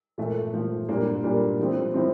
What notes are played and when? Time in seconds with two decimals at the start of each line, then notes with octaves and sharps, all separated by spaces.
0.18 A#2 F3 A3
0.53 A#2 F3 A3
0.89 A#2 G3 A#3 D4
1.24 A#2 G3 A#3 D4
1.59 A2 F3 C4
1.94 A2 F3 C4